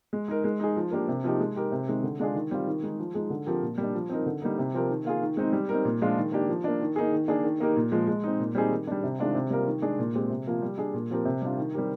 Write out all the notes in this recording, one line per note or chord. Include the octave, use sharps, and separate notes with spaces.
G#3
D#4 A#4
G#3
D#4 G#4
F3
A#3 D4 G4 A#4
C3
F3 A#3 D#4 G4
G#3
D#4 G4 A#4
C3
D#3 G#3 C4
D3
G#3 D4 F4 G#4
D#3
G3 C4 F4
D#3
G#3 D#4
F3
G#3 D#4 G#4
D3
F3 C4 G4 A#4
A#2
G3 A#3 D4
F3
C4 D#4 A#4
D3
G3 A#3 D#4
C3
F3 C4 G4 A#4
D#3
A#3 F4 G#4
D#3
G#3 C4 D#4
G3
C4 D#4 A#4
A#2
F3 G#3 D4 F4
D#3
A#3 D4 G4
F3
A#3 D4
D#3
A#3 D#4 G#4
D#3
A#3 D4 G#4
D#3
A#3 D#4 G4 A#4
A#2
F3 G#3
G#3
C4 D#4
A#2
G3 C4 D#4 G#4
D#3
G3 D4
C3
D#3 G#3 D4 F4
C3
G3 A#3 F4 A#4
D#3
G#3 D4 G#4
A#2
G#3 C4 G4
C3
F3 A#3 F4
G3
D4 G#4
A#2
F3 C4 G4 A#4
C3
G3 D4 F4
D#3
G3 C4 G4 A#4